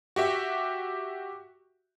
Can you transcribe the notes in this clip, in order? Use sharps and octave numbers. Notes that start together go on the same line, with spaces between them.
F#4 G4 E5